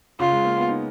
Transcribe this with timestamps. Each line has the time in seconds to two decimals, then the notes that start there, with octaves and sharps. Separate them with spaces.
0.20 C#3 F4
0.32 G#3
0.45 A#3
0.57 B3
0.69 D#4